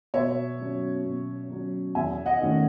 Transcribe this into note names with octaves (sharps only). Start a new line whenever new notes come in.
B2 C#5 E5
F#3 C#4
B2
F#3 C#4
E2 E5 G#5
D#5 F#5
D#3 A3 C#4